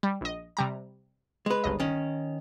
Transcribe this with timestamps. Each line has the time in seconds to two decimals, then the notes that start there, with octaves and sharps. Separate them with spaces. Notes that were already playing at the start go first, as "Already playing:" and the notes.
0.03 G3
0.21 A#1 D#5
0.57 C3 G3 A#5
1.46 G#3 B4
1.64 G1 C#2 D#5
1.80 D#3 C#4